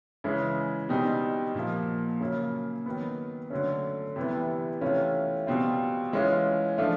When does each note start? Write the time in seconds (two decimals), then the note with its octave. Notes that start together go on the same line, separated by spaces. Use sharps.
0.24 C#3 E3 G#3
0.89 B2 G3 C4 D#4
1.54 A#2 F3 A#3
2.20 C#3 F#3 A#3
2.86 D#3 F#3 B3
3.50 D3 F#3 A3 C#4
4.16 C3 E3 G3 B3
4.81 C3 E3 A3 C#4 F4
5.47 B2 G3 C4 F4
6.13 E3 G#3 C#4 F4
6.78 F3 A3 D4 F4